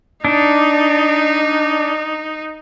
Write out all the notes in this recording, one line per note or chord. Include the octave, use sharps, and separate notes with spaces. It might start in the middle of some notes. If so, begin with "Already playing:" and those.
D4 D#4